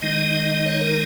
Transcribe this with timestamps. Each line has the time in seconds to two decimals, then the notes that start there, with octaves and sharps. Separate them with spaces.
0.01 D#3 G#3 D#4 D#5
0.66 C#5
0.81 A#4